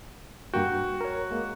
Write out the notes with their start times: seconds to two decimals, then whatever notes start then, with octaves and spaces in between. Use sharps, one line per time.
0.54 G2 A#3 F#4 G5
1.01 A#4 C#5
1.31 G#3 A#3